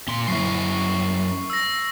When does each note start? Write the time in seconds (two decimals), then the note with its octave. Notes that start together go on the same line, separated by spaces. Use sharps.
0.08 A#2 C6
0.28 F#2 E4 C#6 C7
1.50 E6 A#6